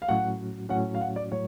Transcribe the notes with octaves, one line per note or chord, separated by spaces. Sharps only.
F5
A2 F#3 C#4 F#4 F#5
A2 F#3 C#4 F#4 F#5
F5
F#5
D5
A2 F#3 C#5